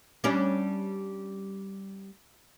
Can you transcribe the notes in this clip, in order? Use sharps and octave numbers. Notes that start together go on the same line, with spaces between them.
G3 C#4 D4